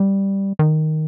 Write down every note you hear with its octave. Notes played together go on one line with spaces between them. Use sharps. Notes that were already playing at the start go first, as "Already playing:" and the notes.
Already playing: G3
D#3